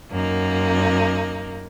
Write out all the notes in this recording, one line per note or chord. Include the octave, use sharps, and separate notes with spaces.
F#2 A#3 D#4